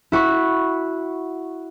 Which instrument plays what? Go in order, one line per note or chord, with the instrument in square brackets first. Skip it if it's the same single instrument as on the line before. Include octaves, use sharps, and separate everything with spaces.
[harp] E4 F#4 B5 C#6